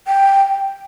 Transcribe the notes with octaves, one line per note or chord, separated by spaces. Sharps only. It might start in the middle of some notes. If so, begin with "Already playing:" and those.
G5